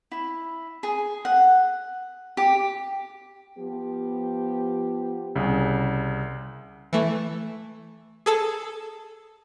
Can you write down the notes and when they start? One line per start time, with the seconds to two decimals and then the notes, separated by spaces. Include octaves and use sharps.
0.12 E4
0.83 G#4
1.25 F#5
2.37 G4
3.58 F3 B3 G4
5.35 C2 C#3
6.93 E3 A3
8.26 G#4 A4 A5